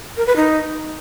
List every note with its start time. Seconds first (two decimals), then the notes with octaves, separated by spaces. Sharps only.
0.17 A#4
0.27 B4
0.36 D#4